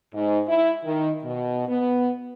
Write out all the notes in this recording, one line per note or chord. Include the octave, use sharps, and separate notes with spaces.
G#2
E4
D#3
B2
B3